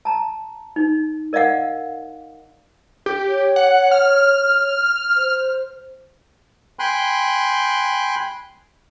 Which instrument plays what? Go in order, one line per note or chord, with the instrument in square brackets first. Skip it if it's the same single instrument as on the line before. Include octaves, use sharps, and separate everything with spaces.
[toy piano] A5 A#5
D#4
A#4 D5 D#5 F5 F#5
[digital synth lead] G4
[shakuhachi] C#5
[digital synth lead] F#5
F6
[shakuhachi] C5
[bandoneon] G5 G#5 B5 C6 F#6